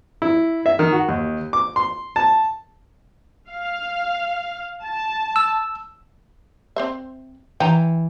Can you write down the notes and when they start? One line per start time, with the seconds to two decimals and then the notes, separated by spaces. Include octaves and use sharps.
0.22 E4
0.66 E5
0.79 D#3
0.92 F#4
1.09 D#2
1.53 D6
1.76 C6
2.16 A5
3.49 F5
4.83 A5
5.36 E6
6.76 C4 C5 E5
7.60 E3 G5 A#5